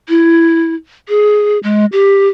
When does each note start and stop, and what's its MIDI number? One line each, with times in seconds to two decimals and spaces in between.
0.09 0.74 64
1.09 1.58 68
1.63 1.86 56
1.92 2.29 67